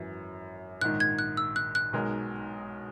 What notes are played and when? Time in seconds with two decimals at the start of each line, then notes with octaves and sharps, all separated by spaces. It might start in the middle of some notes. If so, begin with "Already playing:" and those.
Already playing: G#1 F#2 E3
0.81 A#1 G#2 D#3 F#6
1.00 G#6
1.19 F#6
1.37 E6
1.56 F#6
1.75 F#6
1.93 B1 B2 G#3 D#4 A#4